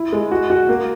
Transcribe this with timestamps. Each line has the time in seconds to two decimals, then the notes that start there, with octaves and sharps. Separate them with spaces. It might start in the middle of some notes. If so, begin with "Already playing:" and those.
Already playing: E4
0.13 G#3
0.31 F#4
0.50 F#4
0.69 A#3